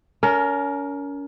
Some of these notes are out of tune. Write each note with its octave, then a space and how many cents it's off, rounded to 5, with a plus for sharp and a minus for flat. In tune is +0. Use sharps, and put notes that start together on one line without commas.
C#4 +35 A#4 +0